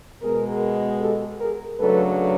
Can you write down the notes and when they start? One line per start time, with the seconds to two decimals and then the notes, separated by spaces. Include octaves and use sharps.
0.22 B2 G#3 B3 G#4 A#4
1.01 G4 A4
1.40 G#4 A#4
1.79 C#3 F#3 A3 D4 A4 B4